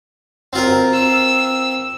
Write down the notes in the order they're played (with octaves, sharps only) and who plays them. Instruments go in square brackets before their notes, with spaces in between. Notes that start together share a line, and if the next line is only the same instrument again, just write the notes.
[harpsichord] C4 F4 A#4
[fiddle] E6